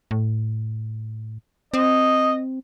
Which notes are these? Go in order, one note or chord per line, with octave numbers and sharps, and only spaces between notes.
A2
C4 D#5